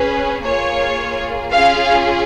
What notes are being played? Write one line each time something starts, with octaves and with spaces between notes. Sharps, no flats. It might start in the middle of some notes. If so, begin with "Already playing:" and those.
Already playing: C#4 G#4 B4
A#3 F4 G#4 C#5
C#4 F4 G#4 F5